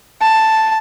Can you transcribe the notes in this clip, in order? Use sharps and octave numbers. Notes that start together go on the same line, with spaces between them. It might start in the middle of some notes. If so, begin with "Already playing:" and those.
A5